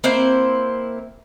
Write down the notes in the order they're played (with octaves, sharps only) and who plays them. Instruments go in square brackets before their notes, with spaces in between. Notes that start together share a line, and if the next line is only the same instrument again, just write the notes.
[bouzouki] A#3 C4 E4 C5